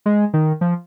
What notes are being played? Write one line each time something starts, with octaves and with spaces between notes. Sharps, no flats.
G#3
D#3
F3